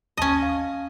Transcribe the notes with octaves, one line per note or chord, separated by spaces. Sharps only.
G#1 D#2 C#4 D#5 A5
F5